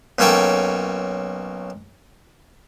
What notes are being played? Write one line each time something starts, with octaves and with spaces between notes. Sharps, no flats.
B1 A#3 C#4 A4 G5 C#6